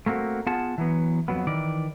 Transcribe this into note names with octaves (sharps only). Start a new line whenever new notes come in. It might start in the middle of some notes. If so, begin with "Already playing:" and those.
A3 A#3 C4 F#4
B3 F4 G#4 F#5 A5
E3 F#3 B3
F2 B2 F#3 B3
D#3 E3 D5